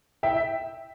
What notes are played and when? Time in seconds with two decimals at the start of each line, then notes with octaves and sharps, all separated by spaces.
0.23 E5 G5